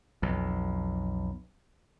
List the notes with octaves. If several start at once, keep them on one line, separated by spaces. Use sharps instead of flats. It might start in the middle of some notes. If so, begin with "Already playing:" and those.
B1 F2